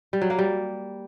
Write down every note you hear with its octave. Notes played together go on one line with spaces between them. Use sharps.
G3
F#3
A#3
G3